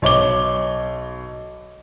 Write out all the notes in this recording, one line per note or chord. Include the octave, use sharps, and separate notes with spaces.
B1 C#5 D6 G7